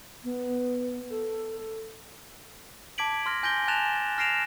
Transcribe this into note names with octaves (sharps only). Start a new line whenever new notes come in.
B3
A4
A5 D6 G#6 B6 D7 F#7
C6 F6 A#6
G#5 G6 A#6 D7 G7
G#5 A5 F#6 A6 E7 F7
F6 A#6 C7 D7 E7 F7